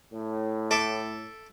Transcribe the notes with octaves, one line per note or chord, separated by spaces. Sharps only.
A2
A4 E5 D6